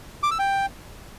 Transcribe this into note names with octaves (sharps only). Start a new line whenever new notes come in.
D6
E6
G5